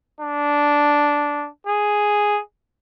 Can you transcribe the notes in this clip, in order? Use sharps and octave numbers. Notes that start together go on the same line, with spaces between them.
D4
G#4